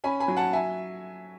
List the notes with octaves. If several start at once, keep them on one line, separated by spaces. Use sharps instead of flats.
C#4 G#5 B5
G#5 B5
F#3
F#5 A5
E5 G#5